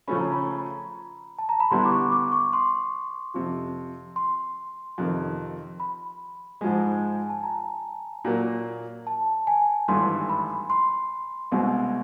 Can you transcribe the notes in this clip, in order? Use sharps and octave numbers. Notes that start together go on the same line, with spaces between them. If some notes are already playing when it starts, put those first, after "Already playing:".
C#3 F3 A3 C#4 B5
A#5
B5
A5
A#5
B5
D3 G3 B3 E4 C6
D6
C#6
D6
C#6
C6
F2 C3 F3
C6
F2 C3 D#3
B5
G#2 F3 G#3
G#5
A5
A#5
A#2 F#3 A#3
A5
G#5
G#1 G2 E3 A3 C6
B5
C6
C2 B2 G#3 C4